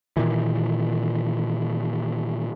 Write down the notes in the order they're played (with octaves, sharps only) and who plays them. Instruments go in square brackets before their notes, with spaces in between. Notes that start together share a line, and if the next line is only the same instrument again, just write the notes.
[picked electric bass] A#2 D#3 E3